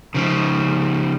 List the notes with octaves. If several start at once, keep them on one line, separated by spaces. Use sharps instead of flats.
C#3 F3